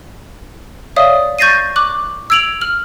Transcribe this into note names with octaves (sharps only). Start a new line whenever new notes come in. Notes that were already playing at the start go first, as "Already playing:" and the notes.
C#5 D5 E5 F5 D#6
C#6 G6 A6 A#6 C7 D#7
C#6 D6 F#6 F#7
E6 G#6 D7 F7 F#7
F6 F#7